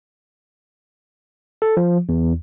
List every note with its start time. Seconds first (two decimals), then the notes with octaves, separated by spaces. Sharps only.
1.62 A4
1.77 F3
2.09 E2